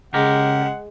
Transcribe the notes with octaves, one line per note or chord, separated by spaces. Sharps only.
C#3 G#3 G4 A#4 F#5